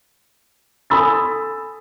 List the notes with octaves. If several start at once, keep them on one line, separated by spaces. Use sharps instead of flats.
A4 G#5 B5 D#6 E6 A6